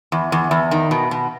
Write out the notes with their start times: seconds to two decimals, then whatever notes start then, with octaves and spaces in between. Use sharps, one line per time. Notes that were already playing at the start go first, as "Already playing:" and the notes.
0.12 E2
0.32 E2
0.51 E2
0.71 D#3
0.91 B2
1.11 B2